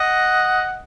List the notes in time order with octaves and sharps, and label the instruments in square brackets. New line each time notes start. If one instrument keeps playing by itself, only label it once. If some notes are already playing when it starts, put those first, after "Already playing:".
Already playing: [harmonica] D#5 F#5